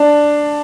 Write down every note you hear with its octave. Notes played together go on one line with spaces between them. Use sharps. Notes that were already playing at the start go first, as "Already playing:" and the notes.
Already playing: D4